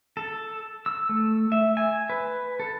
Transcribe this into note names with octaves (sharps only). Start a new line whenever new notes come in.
A4
E6
A3
E5
G#5
B4
A4